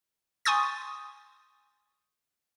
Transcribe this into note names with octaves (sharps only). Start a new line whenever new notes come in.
G#5 C6 C#6 D#6 G6 A6